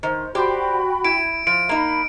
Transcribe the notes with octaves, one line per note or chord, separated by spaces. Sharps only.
D#3 C5
F#4 G4 C5 D5 G5 B5
E4 D7
F3 D7
A#3 D#4 B5